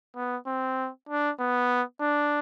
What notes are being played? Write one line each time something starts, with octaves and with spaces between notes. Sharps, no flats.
B3
C4
D4
B3
D4